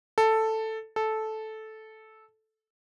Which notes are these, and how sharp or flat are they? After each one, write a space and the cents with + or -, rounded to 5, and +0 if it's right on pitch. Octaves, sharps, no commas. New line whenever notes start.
A4 +5
A4 -10